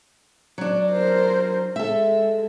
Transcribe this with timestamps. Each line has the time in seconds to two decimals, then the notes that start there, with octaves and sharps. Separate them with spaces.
0.58 F#3 D4
0.92 A#4 C5
1.76 G#3 A4 E5